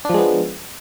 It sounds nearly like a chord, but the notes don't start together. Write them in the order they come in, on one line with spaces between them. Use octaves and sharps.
D4 F3 G#3 B3